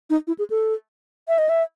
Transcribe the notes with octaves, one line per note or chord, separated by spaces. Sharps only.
D#4
E4
G#4
A4
E5
D#5
E5